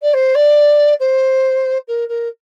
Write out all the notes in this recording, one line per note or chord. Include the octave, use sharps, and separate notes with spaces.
D5
C5
D5
C5
A#4
A#4